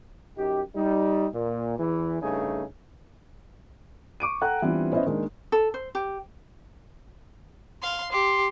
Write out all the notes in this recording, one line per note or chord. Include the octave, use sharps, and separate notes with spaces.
F#2 D#4 G4
G3 D#4
A#2
E2 E3
G2 C#3 A3 D#4 G#4
C#6 D6 D7 D#7
A4 F#5 G5 A#5 F#6
E3 G3 B3 C4 D4 F4
B3 C#4 E4 C5 D#5 E5
D#3 G#3 A#3 D4
A4
C5
G4
F5 C6
G4 C6